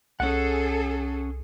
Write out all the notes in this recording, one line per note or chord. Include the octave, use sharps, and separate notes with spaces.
C2 C#4 G#4 A4 F#5